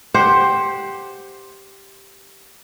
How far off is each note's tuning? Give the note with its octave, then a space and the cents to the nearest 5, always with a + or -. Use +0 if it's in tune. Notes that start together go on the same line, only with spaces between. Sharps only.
G4 +0 C5 +10 F#5 +0